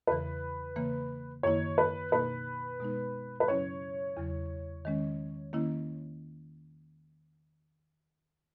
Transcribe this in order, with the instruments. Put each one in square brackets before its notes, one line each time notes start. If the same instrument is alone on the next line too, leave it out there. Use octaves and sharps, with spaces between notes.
[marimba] E2 C#3 E3 [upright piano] B4
[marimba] C#3 E3 A#3
[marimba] F#2 D#3 A#3 E4 [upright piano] C#5
[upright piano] B4
[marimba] B2 A#3 D#4 [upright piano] B4
[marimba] B2 G#3 B3 D#4
[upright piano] B4
[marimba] F#2 C#3 F#3 C#4 E4 [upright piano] C#5
[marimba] E2 C#3 F#3
D#3 G#3 C#4
D#3 A#3 C#4 E4